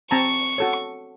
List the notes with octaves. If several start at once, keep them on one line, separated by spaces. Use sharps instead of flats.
C4 A5 A#5 C#6
F#4 A4 C#5